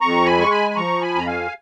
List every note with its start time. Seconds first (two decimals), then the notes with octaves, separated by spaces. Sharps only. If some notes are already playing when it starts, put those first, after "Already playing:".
0.01 F2 A#5 C#6
0.26 G#5 B5
0.38 G#3 C#6
0.51 G#5 B5
0.71 B5
0.76 F3 A#5 C#6
1.01 G#5 B5
1.15 F2 A#5
1.27 F5 G#5